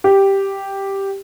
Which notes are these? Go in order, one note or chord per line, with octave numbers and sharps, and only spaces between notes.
G4